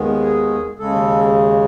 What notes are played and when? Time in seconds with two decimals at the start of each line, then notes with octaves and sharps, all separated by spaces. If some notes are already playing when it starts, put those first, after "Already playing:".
Already playing: D#2 D#3 G#3 B3
0.21 G#4
0.79 D#2 C#3 G#3 A4